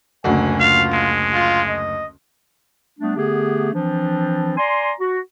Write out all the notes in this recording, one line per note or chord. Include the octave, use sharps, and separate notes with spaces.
F#1 D2 G#5
F4 F5
G#3
F4
D#5
G3 A3 B3 D4
D3 A3 B3 G4 G#4
E3 F3 C4 D4
D5 G#5 A#5 C6
F#4